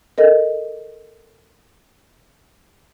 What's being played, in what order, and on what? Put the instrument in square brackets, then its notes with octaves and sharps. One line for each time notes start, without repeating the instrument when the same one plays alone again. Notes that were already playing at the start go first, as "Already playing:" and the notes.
[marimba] A4 A#4 D#5